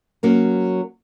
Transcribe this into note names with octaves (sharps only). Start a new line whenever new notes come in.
F#3 A#3 C#4